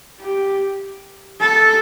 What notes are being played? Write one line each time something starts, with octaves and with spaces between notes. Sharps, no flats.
G4
A4